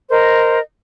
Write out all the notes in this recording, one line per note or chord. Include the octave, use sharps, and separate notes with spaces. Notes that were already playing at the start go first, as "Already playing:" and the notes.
A#4 C5 D#5